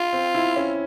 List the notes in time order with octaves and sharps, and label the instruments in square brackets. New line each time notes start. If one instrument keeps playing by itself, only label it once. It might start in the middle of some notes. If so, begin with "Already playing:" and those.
Already playing: [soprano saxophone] F4
[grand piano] C4
E4
C#4